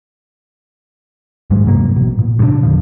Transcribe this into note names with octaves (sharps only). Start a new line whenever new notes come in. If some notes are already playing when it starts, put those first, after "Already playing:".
D#2 G#2 F#3 G#3
G2 C3 F#3 A#3
A1 B2
A#2
G2 A#2 C#3 D4
E2 D3 F3